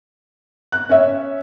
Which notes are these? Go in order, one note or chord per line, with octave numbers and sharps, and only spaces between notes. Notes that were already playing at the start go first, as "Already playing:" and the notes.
F#6
C#4 E5